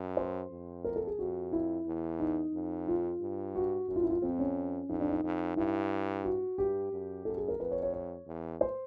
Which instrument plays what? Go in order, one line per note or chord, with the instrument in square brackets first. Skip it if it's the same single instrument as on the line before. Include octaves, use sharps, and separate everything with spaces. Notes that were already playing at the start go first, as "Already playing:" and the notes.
Already playing: [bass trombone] F#2
[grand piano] C5
[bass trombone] F2
[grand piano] A#4
A4
G#4
[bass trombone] F2 [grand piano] F#4
[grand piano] E4
[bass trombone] E2
[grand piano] D#4
[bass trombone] F2
[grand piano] F4
[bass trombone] G2
[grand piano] F#4
[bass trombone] F#2 [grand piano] F#4
[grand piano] F4
E4
F4
[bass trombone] F2 [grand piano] C4
[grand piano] C#4
[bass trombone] F2 [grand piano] D#4
[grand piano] D4
D#4
[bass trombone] F2
[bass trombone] G2 [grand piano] E4
[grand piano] F#4
[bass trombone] G2 [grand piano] G4
[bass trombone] F#2
[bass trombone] F#2 [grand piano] A4
[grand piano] G#4
A#4
[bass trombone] F2 [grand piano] B4
[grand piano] C#5
C#5
C#5
[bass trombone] E2
[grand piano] C5